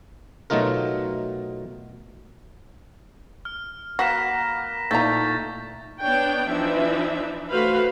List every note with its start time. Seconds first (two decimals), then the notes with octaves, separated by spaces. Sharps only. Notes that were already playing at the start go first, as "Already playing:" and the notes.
0.50 B2 F#3 A3 D#4 F4 A#4
3.45 F6
3.99 A#3 F#4 B4 F5 A#6 B6 E7
4.91 A#2 A3 D#4 E4 A#5 G6 A6 B6
6.02 B3 D4 C#5 G5
6.51 E3 F3 D4 D#4 E5
7.50 A3 F#4 B4 C5 F5 B5